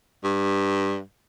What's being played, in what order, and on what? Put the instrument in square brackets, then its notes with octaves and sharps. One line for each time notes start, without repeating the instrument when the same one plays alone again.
[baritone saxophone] G2